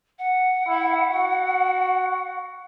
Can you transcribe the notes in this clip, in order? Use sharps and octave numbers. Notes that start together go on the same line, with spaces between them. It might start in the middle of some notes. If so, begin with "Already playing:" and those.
F#5
E4
F#4